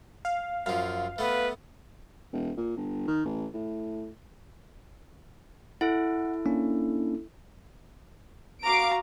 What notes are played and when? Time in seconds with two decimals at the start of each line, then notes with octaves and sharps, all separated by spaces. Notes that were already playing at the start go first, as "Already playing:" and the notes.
0.25 F5
0.66 F#2 F3 F5
1.18 A3 B3 B4
2.33 E1
2.57 A#2
2.76 G1
3.08 D#3
3.25 A1
3.53 A2
5.81 E4 A4 F#5
6.46 A#3 C#4 D4
8.64 F#4 F5 A#5 D6 D7